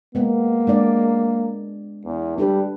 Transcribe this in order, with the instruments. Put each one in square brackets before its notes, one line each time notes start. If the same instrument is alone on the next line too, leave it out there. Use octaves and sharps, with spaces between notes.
[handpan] G#3 B3 [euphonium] A#3
[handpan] G#3 D4 D5
[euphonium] E2
[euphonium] G3 [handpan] D4 A4 B4